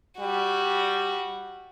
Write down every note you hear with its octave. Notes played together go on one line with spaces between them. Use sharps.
G3 F#4